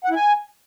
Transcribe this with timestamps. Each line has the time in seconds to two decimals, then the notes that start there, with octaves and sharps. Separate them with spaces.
0.04 F#5
0.10 E4
0.16 G#5